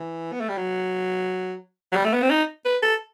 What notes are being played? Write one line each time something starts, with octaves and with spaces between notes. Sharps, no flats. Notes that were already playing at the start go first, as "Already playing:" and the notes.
Already playing: E3
B3
A3
G3
F#3
F#3
G3
A3
B3
C4
D#4
B4
A4